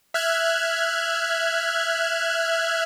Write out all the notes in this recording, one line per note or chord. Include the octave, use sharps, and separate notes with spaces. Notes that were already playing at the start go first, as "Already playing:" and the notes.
E5 F6 F#6 G#6